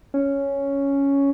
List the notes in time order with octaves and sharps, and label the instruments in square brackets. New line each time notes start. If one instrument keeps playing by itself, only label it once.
[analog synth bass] C#4